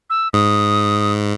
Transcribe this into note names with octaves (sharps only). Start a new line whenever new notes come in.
E6
G#2 D#6